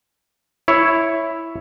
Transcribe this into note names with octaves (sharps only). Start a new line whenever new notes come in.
E4 C#5